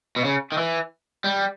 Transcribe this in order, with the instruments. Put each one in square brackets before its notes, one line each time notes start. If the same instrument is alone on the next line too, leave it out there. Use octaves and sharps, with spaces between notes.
[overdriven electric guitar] B2
C#3
D#3
E3
G3